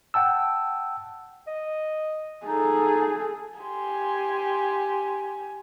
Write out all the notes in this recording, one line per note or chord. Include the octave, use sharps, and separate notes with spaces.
F#5 G5 A5 E6
D#5
D#4 G#4 A4
G4 G#5 C6